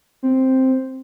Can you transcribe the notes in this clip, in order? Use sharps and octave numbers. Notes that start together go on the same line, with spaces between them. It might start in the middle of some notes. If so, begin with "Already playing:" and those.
C4